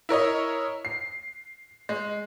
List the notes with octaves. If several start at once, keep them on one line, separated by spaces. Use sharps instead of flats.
E4 A#4 C#5 D#5
C7
G#3